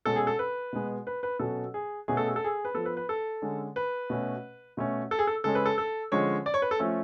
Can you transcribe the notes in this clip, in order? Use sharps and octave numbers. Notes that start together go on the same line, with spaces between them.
B2 G#3 C#4 A4
G#4
A4
B4
B2 G#3 B3
B4
B4
B2 F#3 C#4 A4
G#4
B2 A3 C#4 G#4
A4
G#4
A4
G#4
B4
F3 B3 A4
B4
B4
A4
D3 G#3 C#4
B4
B2 A3 C#4
B2 A3 C#4
A4
G#4
A4
C#3 G#3 C#4 A4
B4
A4
A4
D3 F3 G#3 C#4 C#5
D5
C#5
B4
A4
F3 A3 C#4